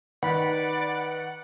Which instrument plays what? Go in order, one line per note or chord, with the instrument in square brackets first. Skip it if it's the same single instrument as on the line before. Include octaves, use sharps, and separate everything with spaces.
[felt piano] D#3 [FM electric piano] B4 B5 [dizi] D5 [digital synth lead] F#5